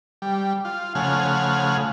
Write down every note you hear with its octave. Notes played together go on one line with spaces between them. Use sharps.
G3
F4
C#3 F3 A3 F#5 G#5 F6